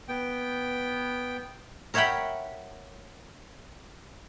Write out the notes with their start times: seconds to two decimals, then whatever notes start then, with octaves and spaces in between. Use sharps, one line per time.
0.08 B3 G5
1.94 A#4 C#5 E5 F#5 G5 B5